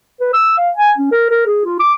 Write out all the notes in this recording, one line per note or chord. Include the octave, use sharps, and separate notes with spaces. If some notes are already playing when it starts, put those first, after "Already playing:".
B4
E6
F5
G#5
C#4
A#4
A#4
G#4
F4
D6